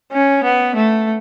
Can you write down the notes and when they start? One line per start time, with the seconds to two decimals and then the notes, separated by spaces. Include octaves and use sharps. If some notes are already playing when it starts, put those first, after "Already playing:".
0.12 C#4
0.44 B3
0.76 A3